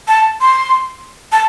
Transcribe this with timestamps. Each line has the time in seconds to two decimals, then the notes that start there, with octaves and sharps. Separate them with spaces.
0.08 A5
0.41 C6
1.32 A5